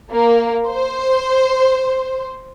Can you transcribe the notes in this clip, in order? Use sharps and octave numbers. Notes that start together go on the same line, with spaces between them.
A#3
C5